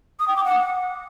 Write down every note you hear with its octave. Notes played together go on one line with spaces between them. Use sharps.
D#6
G5
D6
F#5